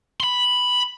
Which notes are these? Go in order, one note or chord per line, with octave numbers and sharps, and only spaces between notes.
B5 C6